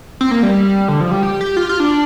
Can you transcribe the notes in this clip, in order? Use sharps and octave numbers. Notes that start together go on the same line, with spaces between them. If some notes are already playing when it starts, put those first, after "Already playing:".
C4
A#3
G3
D3
F3
G3
G4
G4
F4
F4
D4